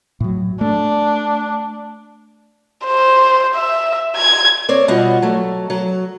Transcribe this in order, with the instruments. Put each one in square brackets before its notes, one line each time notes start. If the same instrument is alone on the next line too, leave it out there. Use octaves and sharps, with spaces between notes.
[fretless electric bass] A2 F#3
[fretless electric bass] A3 [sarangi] D4
[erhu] C5
E5
G#6
[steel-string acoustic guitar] C4 C#5 D5
B2 G3 F4 F#4 D#5 F#5
F#3 A3
F#3